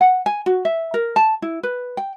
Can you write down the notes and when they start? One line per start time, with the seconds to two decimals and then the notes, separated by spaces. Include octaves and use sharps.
0.01 F#5
0.26 G#5
0.46 F#4
0.65 E5
0.94 A#4
1.16 A5
1.42 E4
1.63 B4
1.97 G5